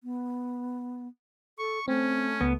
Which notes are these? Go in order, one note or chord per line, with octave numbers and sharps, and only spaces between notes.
B3
A4 C#6
A3 C4 C#4
C#2 B3